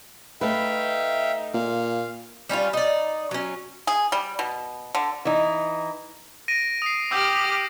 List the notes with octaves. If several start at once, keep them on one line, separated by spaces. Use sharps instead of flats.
A3 D#4 B4 E5 F5 G5
A#2 F5
G3 C#4 E4 F4
D#4 D5
F#3 C#4
G#4
G3
B2
D3
E3 D#4
A#6 D7 D#7
D#6 C7
G4 D6 E6 F6 G6